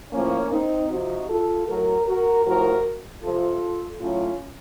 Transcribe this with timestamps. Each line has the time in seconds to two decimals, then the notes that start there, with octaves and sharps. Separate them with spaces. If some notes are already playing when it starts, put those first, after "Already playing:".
0.12 A2 F3 A#3 C#4
0.51 C4 D#4
0.90 C3 F3 D#4 F#4
1.28 F4 A4
1.67 A2 F#3 F#4 A#4
2.06 F#4 A#4
2.45 A2 F3 F#4 A#4
3.22 C3 F3 F4 A4
4.00 A2 F#3 C#4 F4